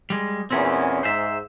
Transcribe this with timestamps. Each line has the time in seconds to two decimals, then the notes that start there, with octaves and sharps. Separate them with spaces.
0.10 G3 G#3
0.51 E2 A#2 C4 C#4
1.03 G#2 C5 E5